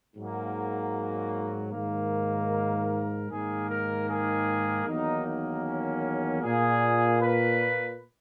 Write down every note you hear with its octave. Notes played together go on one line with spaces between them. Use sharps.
G#2 F#3 A#3
G#2 D#3 A#3
A#4
G#2 D#3 A#3 G#4
A#4
G#4
E2 D#3 F#3 A#3 D#4
D#4
C#4
A#2 A#3 G#4
B4